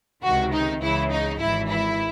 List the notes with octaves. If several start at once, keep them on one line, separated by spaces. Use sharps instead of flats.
C#2 C3 D#3 F#4
D#4
C#2 C#3 E3 E4
D#4
G#1 G#2 E3 E4
E4